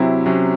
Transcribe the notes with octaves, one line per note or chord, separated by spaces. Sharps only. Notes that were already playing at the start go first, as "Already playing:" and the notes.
Already playing: C3 F#3 C4 E4
C3 F#3 C#4